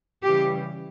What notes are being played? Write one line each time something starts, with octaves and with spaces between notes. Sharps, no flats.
C#3 E3 G3 G4